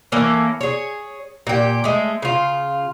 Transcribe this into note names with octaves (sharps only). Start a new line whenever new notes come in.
E3 A#3 C#4 A4
G#4 C#5
A#2 G4
G#3 A3
C#3 F4